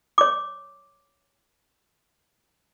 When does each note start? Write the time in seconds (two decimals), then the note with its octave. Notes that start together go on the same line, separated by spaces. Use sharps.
0.18 C#5 D6